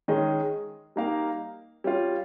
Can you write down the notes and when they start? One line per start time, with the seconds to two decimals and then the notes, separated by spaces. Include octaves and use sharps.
0.08 D#3 G#3 C#4 G#4 D#5
0.96 G3 A#3 D#4 A#4 F5
1.84 G3 C#4 F4